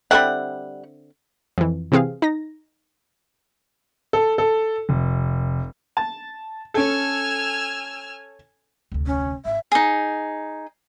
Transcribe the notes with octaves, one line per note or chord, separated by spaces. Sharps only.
D3 G3 C4 E4 F#5
F2 E3
C3 E3 C4 G#4 F5
D#4 A#6
A4
A4
F1
A5
C#4 A4 G#5 E6 F6
F1 D2
C#4
G#1 E5
D#4 G#4